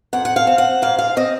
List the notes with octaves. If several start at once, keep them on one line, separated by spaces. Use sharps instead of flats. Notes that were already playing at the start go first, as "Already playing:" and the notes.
F2 F#5
F#5
F5
C4
F#5
G#2 F5
F5
C4 D#5